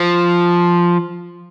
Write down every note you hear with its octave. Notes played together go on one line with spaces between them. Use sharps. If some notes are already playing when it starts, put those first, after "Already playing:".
Already playing: F3